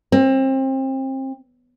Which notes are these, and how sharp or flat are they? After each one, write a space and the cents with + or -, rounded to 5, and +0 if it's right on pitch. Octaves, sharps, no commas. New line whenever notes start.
C4 +30